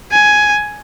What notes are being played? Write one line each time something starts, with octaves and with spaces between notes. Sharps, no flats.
G#5